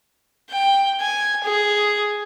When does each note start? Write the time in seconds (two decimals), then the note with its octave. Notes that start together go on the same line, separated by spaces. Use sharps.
0.51 G5
1.01 G#5
1.44 G#4